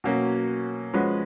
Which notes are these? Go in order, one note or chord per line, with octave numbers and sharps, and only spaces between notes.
B2 F#3 A#3 C#4 F#4
F3 G#3 C#4 F#4 B4